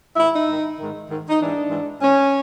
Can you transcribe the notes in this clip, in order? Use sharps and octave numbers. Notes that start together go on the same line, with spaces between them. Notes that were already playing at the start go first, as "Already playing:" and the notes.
G#2 D#3 E4
D#4
G#2 D#3
G#2 D#3
G#2 D#3
D#4
G#2 E3 D4
G#2 E3
G#2 E3 C#4